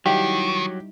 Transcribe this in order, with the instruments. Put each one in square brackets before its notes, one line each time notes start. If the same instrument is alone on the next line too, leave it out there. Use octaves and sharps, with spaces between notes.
[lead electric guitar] D#3 [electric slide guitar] F#3 [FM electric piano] G3 D#4 E4 [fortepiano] G4